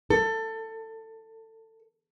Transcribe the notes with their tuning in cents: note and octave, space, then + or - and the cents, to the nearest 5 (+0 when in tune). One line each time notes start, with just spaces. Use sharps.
A4 +20